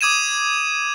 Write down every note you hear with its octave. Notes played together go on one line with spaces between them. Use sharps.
D6 D#6 G#6 D#7 E7